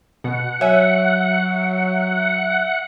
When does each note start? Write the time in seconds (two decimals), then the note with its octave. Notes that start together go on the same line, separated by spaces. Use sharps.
0.24 B2 F#5
0.61 F#3 C#5 E5 G#5